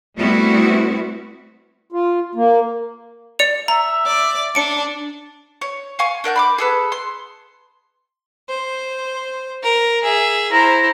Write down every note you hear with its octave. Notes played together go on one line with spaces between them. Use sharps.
G3 A3 B3 C4 E4 F#4
F4
A#3
D5 C#7 F7
E5 A#5
D5
D4 C#7 D7
C#5
F5 G#5 C#6
D4 A#4 F#5 G6
B5 C6 D6
G#4 A4 B4
C6
C5
A#4
G#4 E5
E4 C5 A#5